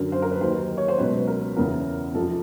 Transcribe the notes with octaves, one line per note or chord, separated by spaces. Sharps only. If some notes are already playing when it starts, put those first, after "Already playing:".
Already playing: F#2 D3 F#3 A#4
C5
A#4
B4
D#2 D#3 F#3 C5
C#5
C5
C#2 B2 F#3 B4
A#4
E2 C#3 E3 A#4
F2 C3 F3 A4